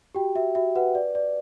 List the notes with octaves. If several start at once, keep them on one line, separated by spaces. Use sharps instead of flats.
F#4 G4 G5
F#4 E5
F#4 E5
F#4 B4 F#5
D5
D5